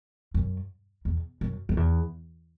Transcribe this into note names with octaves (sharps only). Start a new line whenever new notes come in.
F#2
E2
F#2
F#2
E2